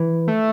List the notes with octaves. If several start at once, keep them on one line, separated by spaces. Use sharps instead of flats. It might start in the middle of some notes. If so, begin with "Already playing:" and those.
Already playing: E3
A3